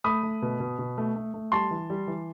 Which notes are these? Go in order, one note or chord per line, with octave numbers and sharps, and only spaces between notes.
A3 B5 D#6
A3
B2
B2
B2
A3
A3
A3
G3 A5 C6
E3
G3
E3